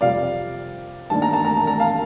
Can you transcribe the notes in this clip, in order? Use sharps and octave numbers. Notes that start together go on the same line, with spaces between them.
F2 C3 G3 D5 F5
G2 D#3 A#3 D4 A5
A#5
A5
A#5
A5
A#5
F5 A5